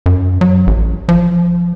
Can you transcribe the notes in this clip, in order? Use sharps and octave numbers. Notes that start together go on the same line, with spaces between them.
F#2
F#3
A1
F3